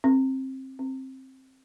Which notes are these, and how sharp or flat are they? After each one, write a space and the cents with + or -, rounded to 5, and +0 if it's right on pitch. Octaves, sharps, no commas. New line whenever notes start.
C4 +20
C4 +15